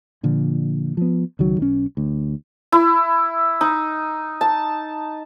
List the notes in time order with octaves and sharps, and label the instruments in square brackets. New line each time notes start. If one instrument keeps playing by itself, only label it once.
[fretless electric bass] A#2 D3 F3
F3 B3
C#2 D#3 F#3
B1 C#4
D2
[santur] E4
D#4
A5